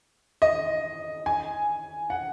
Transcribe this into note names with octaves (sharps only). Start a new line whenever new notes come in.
D#5
G#5
F#5